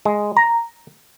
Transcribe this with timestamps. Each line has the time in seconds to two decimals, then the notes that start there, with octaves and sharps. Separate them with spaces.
0.05 G#3
0.37 A#5